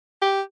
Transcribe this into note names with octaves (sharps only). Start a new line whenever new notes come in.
G4